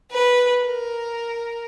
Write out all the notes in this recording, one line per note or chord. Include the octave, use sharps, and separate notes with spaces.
B4
A#4